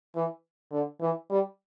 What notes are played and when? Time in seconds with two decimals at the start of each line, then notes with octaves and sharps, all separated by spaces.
0.15 E3
0.72 D3
1.01 E3
1.30 G3